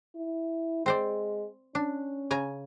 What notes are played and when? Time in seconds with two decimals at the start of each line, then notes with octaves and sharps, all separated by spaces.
0.16 E4
0.86 G#3 C4 C5 D5
1.75 C#4 D4
2.31 C#3 G#5 A#5